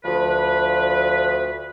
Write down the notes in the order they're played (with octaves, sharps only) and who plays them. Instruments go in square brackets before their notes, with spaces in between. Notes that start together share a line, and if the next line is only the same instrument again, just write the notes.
[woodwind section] D2 F3 B4